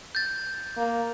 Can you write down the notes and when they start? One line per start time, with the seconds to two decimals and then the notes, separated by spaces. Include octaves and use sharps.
0.15 G6 A6
0.77 A#3